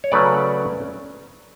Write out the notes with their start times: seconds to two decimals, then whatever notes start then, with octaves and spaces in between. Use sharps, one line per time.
0.04 C#5
0.12 C#3 F#3 A3 C#4 B4 D5